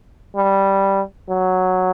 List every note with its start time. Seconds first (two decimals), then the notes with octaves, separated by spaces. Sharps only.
0.36 G3
1.29 F#3